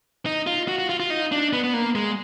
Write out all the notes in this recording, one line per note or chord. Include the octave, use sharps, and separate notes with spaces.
D#4
F4
F#4
F#4
F4
F4
D#4
D4
B3
B3
A#3
G#3